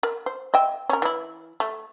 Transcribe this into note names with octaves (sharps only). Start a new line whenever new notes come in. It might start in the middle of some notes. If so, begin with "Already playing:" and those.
A#4
C5
D#5 E5 G5
C#4 A#4
E3 E4
A3